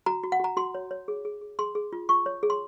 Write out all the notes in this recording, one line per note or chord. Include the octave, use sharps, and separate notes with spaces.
F#4 A#5
F#4
F#5
F#4 A#5
F#4 C6
C#5
C#5
G#4
G#4
G#4
G#4 C6
G#4
F4
F4 C#6
C#5
G#4
C6